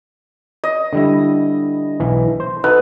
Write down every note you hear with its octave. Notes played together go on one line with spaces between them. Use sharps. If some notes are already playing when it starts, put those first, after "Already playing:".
D#5
D3 G3 E4
B1 E3
C5
D#4 F#4 A4 B4